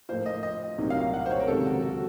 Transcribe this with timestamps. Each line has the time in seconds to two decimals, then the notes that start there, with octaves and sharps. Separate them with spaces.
0.09 A2 F3 A#3 F4 C5
0.26 D#5
0.43 D#5
0.78 C2 A#2 F#3 A#3 D#4
0.90 F5
1.01 F5
1.14 F#5
1.26 C5
1.31 C#5
1.40 A#4
1.47 C#2 C3 D#3 F#3 A4
1.66 F#4
1.82 F#4